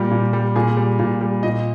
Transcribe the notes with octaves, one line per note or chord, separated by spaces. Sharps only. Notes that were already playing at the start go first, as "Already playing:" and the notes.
Already playing: A#2 G3 G4
A#2
G3
A#2 G#4
G3
A#2
G3
A#2 D#5